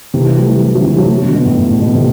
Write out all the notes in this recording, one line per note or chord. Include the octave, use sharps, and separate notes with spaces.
C3 E3
E3 G3
F#3 A3
E3 G3
D3 F#3
C3 E3
G3
F#3 A3
B2 D3
B2
A2
A2
A2
B2
A2 C3